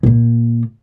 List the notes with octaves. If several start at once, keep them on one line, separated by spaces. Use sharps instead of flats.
A#2 A#3